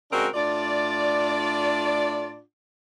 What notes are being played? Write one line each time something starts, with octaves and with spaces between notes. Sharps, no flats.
C#3 G#3 C4 D4 F#4 A#4
A2 D4 F4 D5